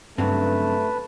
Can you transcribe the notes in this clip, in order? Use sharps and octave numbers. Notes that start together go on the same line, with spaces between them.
G2 C#3 F#3 A3 C4 B4 A5